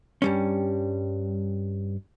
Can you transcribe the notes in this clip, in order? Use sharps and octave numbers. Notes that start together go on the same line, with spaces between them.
G2 G3 C#4